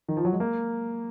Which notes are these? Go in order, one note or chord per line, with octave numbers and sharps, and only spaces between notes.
D#3
F3
F#3
G#3
A#3